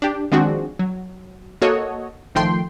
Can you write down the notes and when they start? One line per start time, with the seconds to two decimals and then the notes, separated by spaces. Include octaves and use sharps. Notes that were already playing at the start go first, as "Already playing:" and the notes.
0.02 D4 G4
0.32 D#3 F3 G#3 C4 D4 F#4
0.79 F#3
1.62 A#3 F#4 A4 C#5 D#5
2.35 A1 D#3 F3 A3 G5 C6